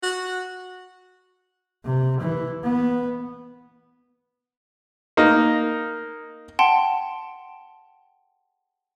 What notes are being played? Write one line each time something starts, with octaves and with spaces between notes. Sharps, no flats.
F#4
C3
E3
B3
A#3 D#4
F#5 G5 A5 C6